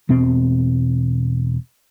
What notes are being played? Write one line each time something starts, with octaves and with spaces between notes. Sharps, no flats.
E1 B2 C4